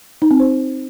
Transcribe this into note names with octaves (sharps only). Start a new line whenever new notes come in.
D#4
C4
C5